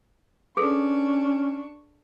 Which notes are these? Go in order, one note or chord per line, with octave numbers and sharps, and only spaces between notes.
C#4 D4 G#4 A4 B4 C#6